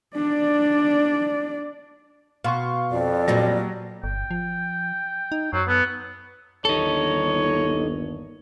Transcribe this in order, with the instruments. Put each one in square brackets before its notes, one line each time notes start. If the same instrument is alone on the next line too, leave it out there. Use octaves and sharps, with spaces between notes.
[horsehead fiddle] D4 D5
[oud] B2 F#4 [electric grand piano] F5 C6 C#6
[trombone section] F2 [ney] D5
[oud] A#2 G3 B3 [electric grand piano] F#3 A#6
[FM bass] G1 [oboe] G5
[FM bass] F3
D#4
[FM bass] F#2 [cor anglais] F#3 [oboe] C5
[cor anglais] B3 [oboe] A4
[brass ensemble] G1 D#2 [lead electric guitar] D#4 A4 [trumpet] C#5